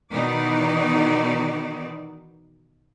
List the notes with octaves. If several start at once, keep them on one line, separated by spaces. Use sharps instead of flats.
B2 D#3 E3 B3 D#4 D5